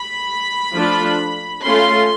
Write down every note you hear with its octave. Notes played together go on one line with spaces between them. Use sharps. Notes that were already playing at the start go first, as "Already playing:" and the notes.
Already playing: B5
F3 A3 D4 F4
A3 C#4 F4 C6